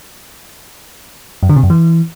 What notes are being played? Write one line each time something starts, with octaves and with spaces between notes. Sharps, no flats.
F#2
D3
C3
F#2
E3